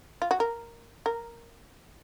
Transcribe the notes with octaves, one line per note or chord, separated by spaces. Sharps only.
F4
F#4
A#4
A#4